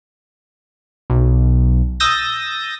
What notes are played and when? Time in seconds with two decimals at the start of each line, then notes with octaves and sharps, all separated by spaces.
1.10 B1
2.00 D#6 E6 G6 A6 A#6